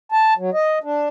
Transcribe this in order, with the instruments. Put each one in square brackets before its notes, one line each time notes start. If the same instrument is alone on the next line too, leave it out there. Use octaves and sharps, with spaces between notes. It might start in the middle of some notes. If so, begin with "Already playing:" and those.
[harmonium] A5
F#3
D#5
D4